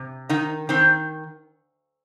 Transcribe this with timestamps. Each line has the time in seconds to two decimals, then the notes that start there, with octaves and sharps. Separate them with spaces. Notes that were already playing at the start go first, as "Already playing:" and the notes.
Already playing: C3
0.29 D#3 D#4
0.69 D#3 C4